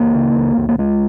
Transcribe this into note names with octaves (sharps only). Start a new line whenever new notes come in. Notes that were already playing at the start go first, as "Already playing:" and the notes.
Already playing: C#2 A#3
C#3
C#2
C#2
A#3
C#2 G#3